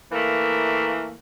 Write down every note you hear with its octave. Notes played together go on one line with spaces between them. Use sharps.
E3 A3 A#3